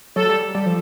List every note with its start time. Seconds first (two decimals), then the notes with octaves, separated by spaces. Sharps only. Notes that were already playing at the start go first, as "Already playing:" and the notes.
0.16 F#3 A4
0.30 G3
0.55 G3
0.66 F3